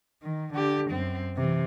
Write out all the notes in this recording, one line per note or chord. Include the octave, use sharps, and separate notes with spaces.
D#3
D3 G4
F#2 C4
C3 E3